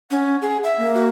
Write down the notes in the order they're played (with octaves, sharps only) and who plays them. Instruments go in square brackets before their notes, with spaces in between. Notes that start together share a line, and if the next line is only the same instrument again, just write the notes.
[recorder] C#4 [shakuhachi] F#5
[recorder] G#4
E5
[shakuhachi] A#3
[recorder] F#4